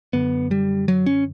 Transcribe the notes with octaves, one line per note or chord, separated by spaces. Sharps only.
F#2 D3 B3
G3
F#3
C#4